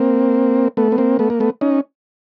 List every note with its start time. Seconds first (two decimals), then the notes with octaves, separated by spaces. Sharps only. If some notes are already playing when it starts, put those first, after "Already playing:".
Already playing: A#3 C4
0.77 A3 B3
0.92 B3
0.98 A#3 C4
1.19 A3 B3
1.30 A#3
1.40 A3 B3
1.61 C#4 D#4